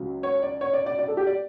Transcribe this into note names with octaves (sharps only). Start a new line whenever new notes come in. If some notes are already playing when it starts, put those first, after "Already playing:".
Already playing: C#2 C#3 F#3
C#5
D5
C#5
D5
D5
D5
A4
G4
D5